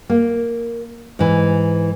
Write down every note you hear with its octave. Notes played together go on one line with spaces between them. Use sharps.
A#3
G#2 E3